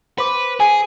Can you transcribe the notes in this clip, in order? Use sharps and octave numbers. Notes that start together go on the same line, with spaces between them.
B4 C5 D6
G#4 G#5